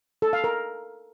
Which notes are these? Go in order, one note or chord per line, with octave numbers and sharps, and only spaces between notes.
A4
F5
A#4